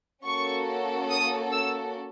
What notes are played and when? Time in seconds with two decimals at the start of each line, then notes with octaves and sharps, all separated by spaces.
0.25 A#3 C#4 F#4 A4 C#6
1.10 D#6
1.53 E6